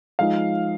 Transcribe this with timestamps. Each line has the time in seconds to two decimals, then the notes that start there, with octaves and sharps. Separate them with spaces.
0.19 F3 G#3 D#4 F5